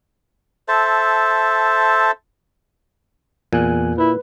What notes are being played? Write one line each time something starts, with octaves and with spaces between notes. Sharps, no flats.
A4 C5 E5 A5
E2 A#2 G#5 F#6
E4 B4